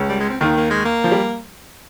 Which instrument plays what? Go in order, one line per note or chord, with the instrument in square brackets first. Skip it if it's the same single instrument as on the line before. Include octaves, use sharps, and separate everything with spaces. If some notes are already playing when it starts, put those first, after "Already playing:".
Already playing: [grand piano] C#2 C#3
[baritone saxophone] G3
G#3
C4
[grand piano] D#2 D#3 [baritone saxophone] A#3
[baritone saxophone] A#3
G#3
A#3
[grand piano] F3
G3